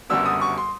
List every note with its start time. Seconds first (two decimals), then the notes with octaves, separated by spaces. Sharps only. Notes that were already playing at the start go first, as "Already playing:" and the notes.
0.10 F#1 F#2 D3 G3 B3 E6
0.26 D#6
0.41 C#6
0.58 C6